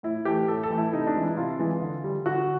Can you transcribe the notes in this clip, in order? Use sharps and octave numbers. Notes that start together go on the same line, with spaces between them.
A2 E4
E3 A3 G4
A2 A4
A4
E3 A3
E4
C3 D#4
D4
E3 G#3
E4
C3 F4
E3 G#3
D3
G3
D3 F#4